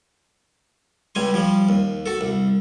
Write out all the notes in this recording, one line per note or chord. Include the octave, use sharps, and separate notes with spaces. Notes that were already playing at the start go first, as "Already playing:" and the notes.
C#2 G3 G#5 C6
F3 G3
D#2
F#4 A4
C2